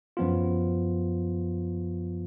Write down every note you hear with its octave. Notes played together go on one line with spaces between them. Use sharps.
F#2 F3 B3 F4